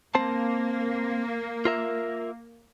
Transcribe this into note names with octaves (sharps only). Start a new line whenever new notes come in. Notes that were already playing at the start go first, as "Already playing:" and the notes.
A#3 C4 C5 A5
F4 A#4 E5